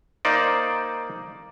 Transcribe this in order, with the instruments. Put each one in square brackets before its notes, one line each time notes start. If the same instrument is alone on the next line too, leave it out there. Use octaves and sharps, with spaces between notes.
[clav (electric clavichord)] A#3 D#4 C5 D5